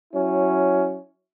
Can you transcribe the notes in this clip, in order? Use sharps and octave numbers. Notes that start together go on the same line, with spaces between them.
F#3 C#4 E4